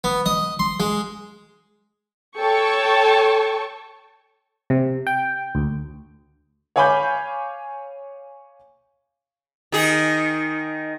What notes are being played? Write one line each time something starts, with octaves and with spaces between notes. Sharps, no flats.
B3
D#5
C6
G#3
A4 C#5 G5 A5 C#6
C3
G5
D2
C#5 F5 G#5 B5 D6 G6
D#3 G#4